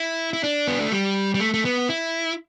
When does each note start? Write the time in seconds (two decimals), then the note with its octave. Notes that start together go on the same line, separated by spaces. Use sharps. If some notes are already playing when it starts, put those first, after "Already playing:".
Already playing: E4
0.33 E4
0.44 D4
0.68 B3
0.80 A3
0.92 G3
1.35 G3
1.40 A3
1.54 A3
1.65 B3
1.89 E4